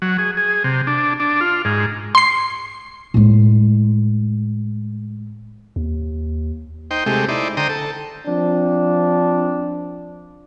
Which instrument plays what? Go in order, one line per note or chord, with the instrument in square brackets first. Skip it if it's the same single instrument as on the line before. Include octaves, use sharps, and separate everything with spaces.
[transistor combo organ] F#3
G#4
G#4
C3
D4
D4
F4
G#2
[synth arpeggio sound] C6 C7
[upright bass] A2 G#3
[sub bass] D#2
[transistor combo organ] D#4 C5 G5
C3 G#3 A3 G4
D#4 E4 C5 D5
D3 C5 G5 A#5 D#6
A4
[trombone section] F3 C4 D4